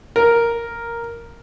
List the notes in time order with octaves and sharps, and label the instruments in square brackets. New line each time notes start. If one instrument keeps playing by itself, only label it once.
[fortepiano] A#4